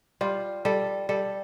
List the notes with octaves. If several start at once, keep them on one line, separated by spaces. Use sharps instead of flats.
G3 F4
G3 A4
G3 A4